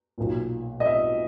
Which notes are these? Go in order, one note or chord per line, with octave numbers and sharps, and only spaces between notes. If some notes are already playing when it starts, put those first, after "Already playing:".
B1 A#2
D#5
E5